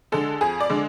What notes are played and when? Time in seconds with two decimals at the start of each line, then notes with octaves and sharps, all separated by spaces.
0.12 D3 G#3 A4
0.41 F2 G#4
0.60 D5
0.70 D3 G#3